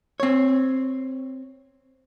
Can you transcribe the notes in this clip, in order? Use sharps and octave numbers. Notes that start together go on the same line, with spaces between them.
C4 C#5